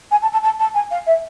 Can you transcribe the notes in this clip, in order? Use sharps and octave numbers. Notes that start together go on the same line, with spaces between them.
G#5
A5
A5
A5
A5
G#5
F5
E5